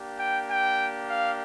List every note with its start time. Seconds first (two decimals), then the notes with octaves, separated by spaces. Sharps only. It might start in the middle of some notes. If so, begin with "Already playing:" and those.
Already playing: A#3 D4 G4
0.18 G5
0.49 G5
1.09 F5